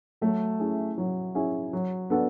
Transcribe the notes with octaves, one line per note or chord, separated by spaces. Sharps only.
F#3 A3
C#4 E4 G#4
F#3
C#4 E4 G#4
F#3
B3 D4 F#4 A4